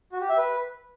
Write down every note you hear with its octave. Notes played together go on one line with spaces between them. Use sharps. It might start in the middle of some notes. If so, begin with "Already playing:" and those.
F#4
G4
E5
B4